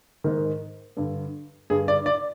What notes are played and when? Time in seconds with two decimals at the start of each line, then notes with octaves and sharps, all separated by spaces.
0.24 G#2 D#3
0.97 G2 D3
1.70 G2 D3 G#4
1.88 D5
2.06 D5